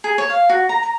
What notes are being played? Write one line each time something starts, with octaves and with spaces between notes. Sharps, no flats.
G#4
C#5
F5
F#4
A#5
A#5